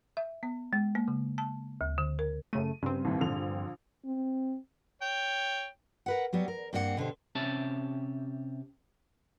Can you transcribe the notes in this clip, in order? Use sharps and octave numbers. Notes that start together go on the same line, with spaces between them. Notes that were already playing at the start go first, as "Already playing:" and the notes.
E5
B3
G#3
A#3
C#3
A5
D2
D3
A#4
F#2 C#3 A3 D#7
G2 C#3 C4
D#2 A2 E3
A#1 D3 F7
C4
C#5 G5
A#4 B4 F#5
F#3 G3 B3
A#4
G2 A#3 C4 F#4 F#5
B2 D3 G4 C5
C3 C#4 G4 E5 A5